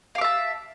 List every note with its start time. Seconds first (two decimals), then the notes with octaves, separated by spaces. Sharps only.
0.15 F5
0.18 D6
0.21 E5
0.24 A5